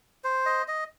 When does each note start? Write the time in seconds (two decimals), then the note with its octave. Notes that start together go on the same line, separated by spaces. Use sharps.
0.24 C5
0.46 D#5
0.68 D#5